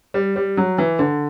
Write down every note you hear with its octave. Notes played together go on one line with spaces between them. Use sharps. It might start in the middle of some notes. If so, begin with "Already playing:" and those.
G3
G3
F#3
E3
D3